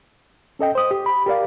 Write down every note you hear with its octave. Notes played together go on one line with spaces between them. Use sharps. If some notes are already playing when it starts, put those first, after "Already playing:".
C#4 A4 D#5 G5
C5 D#6
G4
B5
G4 A#4 D5 F5